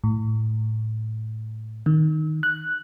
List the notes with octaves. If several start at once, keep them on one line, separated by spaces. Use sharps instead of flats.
A2
D#3
F#6